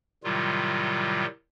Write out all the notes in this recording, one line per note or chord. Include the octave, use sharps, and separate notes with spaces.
A2 C3 D#3 F#3 G3 F4